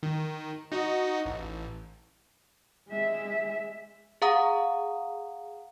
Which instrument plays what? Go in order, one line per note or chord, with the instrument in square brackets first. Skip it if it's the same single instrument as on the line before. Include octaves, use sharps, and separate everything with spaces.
[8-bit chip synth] D#3
D#4 F#4 D#5
A1
[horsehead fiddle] G#3 E5
[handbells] G#4 F5 F#5 A#5 D#6